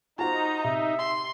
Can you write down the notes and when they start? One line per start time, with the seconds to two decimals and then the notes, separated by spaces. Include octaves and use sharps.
0.19 D#4 F4 F#4 C5 A#5
0.64 C3 E5
0.99 C6